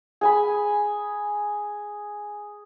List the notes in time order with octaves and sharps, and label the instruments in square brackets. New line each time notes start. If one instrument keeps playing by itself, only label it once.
[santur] G#4 G#5 B5